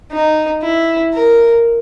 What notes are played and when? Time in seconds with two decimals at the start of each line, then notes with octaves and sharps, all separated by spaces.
0.12 D#4
0.63 E4
1.13 A#4